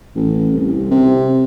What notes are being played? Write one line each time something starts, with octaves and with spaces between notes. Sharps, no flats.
A1
C2
C3